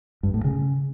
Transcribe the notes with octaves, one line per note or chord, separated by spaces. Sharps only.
G2
A2
C#3